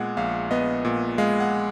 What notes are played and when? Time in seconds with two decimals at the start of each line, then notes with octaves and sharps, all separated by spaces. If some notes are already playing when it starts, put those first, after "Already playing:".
Already playing: A#2 G#3 B3 F#5
0.17 A#1 F5
0.51 B3 D#5
0.85 A#2
1.18 G#3 F5
1.40 F#5